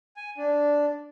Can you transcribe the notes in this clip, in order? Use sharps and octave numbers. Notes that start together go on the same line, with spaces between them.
G#5
D4